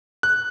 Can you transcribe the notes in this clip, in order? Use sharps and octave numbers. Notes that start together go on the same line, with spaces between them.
F#6